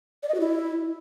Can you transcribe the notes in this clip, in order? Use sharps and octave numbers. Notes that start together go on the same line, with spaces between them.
D5
D#5
F#4
E4